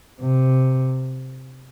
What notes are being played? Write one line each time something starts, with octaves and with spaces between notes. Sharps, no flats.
C3